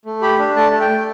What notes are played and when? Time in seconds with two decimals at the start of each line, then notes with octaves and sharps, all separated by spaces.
0.06 A3
0.22 G4 B5
0.39 D4
0.56 A3 A5
0.73 A3
0.81 G5
0.90 A3